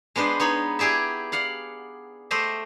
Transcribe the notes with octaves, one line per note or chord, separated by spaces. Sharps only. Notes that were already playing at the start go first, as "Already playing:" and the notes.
G#3 B3 D4 B4 C5
B3 D#4 C#5 B5
E4 G4 G#4 D5 E5
D5 F5 F#5
A3 G4 C5 D#5 E5